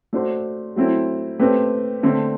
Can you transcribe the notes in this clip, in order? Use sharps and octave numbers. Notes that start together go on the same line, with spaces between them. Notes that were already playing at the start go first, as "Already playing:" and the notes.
A3 D4 F#4 C5
F#3 A3 C4 E4
A3 C4 G4 B4
D3 A3 C4